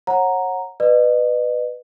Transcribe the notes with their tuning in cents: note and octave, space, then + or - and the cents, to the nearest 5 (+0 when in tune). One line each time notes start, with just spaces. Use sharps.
C#5 -30 F#5 -10 A#5 +0
B4 +5 D#5 -40